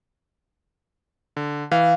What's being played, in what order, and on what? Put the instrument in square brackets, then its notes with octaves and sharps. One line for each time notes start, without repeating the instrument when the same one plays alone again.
[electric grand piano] D3
[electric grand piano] E3 [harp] F5